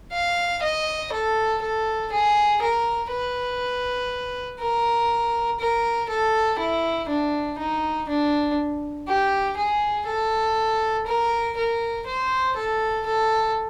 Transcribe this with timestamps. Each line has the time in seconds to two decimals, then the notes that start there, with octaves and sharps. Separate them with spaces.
0.12 F5
0.62 D#5
1.12 A4
1.62 A4
2.12 G#4
2.62 A#4
3.11 B4
4.60 A#4
5.60 A#4
6.09 A4
6.59 E4
7.09 D4
7.58 D#4
8.09 D4
9.08 G4
9.57 G#4
10.07 A4
11.07 A#4
11.57 A#4
12.07 C5
12.56 A4
13.06 A4